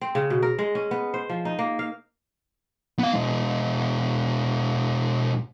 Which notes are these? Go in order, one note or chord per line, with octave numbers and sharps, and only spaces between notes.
C4
C#3
B2
A#4
G#3
C#4
B3
C5
F3
D#4
A#3
F5
B3 F5
B2 G#3